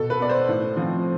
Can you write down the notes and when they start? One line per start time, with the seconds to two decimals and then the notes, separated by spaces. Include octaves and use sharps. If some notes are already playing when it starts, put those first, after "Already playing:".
Already playing: B2 A4
0.10 B4
0.20 B3 D5
0.30 C5
0.49 A2
0.77 F3 C4